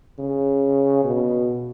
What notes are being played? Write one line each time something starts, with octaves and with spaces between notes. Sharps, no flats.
C#3
B2